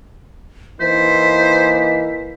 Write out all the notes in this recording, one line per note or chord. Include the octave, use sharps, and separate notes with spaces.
E3 A#3 D#4 C5 B6